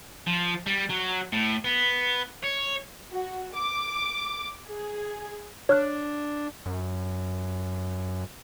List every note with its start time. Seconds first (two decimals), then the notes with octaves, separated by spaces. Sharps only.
0.27 F3
0.66 G3
0.90 F#3
1.32 A2
1.64 B3
2.44 C#5
3.12 F#4
3.55 D6
4.67 G#4
5.69 D4 C#5 F6 F#6
6.66 F#2